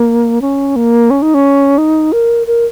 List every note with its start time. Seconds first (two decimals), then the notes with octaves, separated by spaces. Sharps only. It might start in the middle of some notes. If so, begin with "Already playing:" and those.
Already playing: A#3
0.41 C#4
0.76 A#3
1.10 C#4
1.22 D#4
1.34 C#4
1.78 D#4
2.12 A#4
2.47 A#4